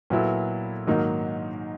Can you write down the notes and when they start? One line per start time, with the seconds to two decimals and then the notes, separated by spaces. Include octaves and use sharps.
0.10 A#2 F#3 B3 E4 A4
0.87 G#2 D#3 F#3 A#3 D#4